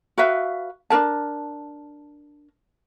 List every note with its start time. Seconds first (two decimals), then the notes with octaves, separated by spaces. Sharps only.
0.18 F#4 B4 E5 F5
0.90 D4 D#4 A#4 A5